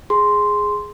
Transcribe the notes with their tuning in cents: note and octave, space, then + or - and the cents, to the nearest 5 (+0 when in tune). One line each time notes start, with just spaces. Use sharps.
G#4 +0 C6 -5